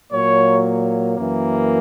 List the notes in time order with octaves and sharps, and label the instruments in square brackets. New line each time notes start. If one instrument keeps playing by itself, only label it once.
[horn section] A#2 F#3 A#3 C#5
F#2 E3 A#3